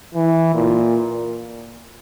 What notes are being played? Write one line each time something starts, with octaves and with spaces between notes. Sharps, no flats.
E3
A#2